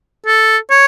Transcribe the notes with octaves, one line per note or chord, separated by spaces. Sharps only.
A4
C#5